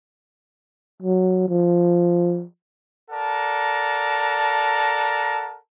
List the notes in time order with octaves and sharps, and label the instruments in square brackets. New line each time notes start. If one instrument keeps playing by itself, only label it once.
[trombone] F#3
F3
[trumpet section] A4 A#4 D5 F#5 A5 A#5